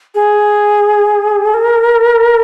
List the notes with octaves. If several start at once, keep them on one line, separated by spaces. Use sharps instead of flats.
G#4
A#4